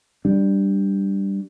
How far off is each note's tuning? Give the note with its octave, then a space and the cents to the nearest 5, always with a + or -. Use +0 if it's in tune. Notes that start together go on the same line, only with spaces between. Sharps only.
G3 +0 D4 +0